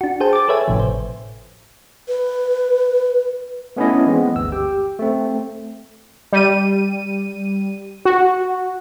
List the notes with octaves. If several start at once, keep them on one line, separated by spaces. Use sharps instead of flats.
D4 F#4
G#4 C5 G5 A5
D6 A6
A4 B4 C#5 E5 G#5
G#1 A2 C3 F3
C5
B4
A3 B3 C#4 D4 E4 D#5
E3 G#3 B3 C4
G1 D2 E6
G4 G5
A3 C4
G3 D#7
F#4